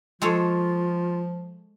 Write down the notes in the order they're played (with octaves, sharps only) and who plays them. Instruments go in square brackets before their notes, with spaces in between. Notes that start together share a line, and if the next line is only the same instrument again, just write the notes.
[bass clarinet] F3 [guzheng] G#3 A4 C#5 [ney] F4